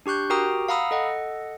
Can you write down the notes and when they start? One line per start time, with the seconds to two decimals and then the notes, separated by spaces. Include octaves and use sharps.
0.06 D4 G4 C#6 F#6 G6
0.30 F#4 G4 A#4 G5 A#5 D#6
0.68 F5 F#5 A#5 B5 D#6 E6
0.91 A4 D#5 F#5